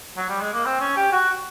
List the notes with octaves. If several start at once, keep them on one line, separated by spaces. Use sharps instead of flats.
F#3
G3
G#3
A#3
C4
C#4
G4
F#4